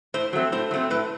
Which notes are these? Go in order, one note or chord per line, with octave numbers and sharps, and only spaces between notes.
A2 C5
F#3 A3 C4
A2 C5
F#3 A3 C4
A2 B4